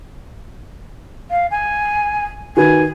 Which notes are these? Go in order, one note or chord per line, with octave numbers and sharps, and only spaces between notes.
F5
G#5
D#3 F#4 B4 G#5